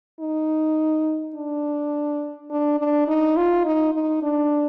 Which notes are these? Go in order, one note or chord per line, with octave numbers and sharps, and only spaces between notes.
D#4
D4
D4
D4
D#4
F4
D#4
D#4
D4